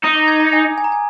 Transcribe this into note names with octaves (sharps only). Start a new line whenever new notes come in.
D#4 D#6
D6
G#6
A#5
G#5
G#5
A#5
G#5